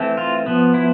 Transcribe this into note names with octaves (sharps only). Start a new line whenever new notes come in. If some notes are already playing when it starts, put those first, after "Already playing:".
Already playing: E3 A3 C4
F4
F3 B3
E4